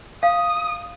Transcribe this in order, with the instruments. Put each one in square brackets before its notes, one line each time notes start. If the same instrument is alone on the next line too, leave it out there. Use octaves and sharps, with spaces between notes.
[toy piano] F5 [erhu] D#6